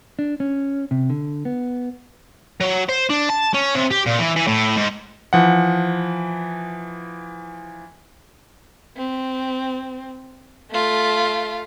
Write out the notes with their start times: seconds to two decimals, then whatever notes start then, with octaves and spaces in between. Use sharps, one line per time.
0.19 D4
0.40 C#4
0.91 C3
1.10 D3
1.45 B3
2.61 F#3
2.89 C5
3.10 D4
3.30 A5
3.55 C#4
3.75 C3
3.91 G4
4.06 A#2
4.19 E3
4.36 E3
4.48 A2
4.77 G#2
5.33 E3 F3 F#5
8.97 C4
10.71 A3 F4